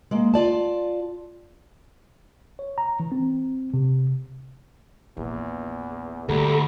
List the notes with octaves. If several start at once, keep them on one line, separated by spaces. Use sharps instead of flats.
G#3 A#3
F4 D5 A5
C#5
A#5
E3
C4
C3
A#1 E2
D2 G2 G3 A3 A4 A#5 B5